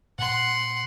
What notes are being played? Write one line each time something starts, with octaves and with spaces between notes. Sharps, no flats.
A#2 F#5 C6